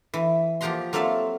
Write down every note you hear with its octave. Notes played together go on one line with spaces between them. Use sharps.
E3
F3 A#3 G4 F#5 A#5 C6
F#3 A#3 C4 A4 E5 F5